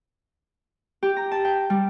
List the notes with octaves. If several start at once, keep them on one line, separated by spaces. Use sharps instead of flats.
G4
A#5
A5
G5
G3